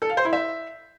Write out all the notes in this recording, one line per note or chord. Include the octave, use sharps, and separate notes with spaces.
A4
F5
C5
E4
E5